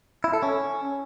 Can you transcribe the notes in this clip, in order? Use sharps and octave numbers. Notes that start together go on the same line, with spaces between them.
E4
A4
C#4